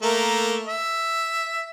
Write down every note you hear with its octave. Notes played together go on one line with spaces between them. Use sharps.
A3 A#3 A#4
E5